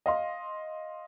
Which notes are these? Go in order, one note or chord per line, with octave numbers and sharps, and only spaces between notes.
D#5 F5 C6